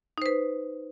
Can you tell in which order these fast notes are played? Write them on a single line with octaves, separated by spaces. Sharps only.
D#4 C5 B4